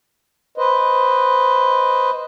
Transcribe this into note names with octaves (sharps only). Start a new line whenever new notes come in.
B4 C5 D#5